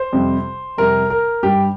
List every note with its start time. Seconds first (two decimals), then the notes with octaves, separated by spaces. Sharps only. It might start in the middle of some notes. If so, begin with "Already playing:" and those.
Already playing: C5
0.13 F2 C3 G3
0.78 F2 C3 G3 A#4
1.10 A#4
1.43 G2 G3 G4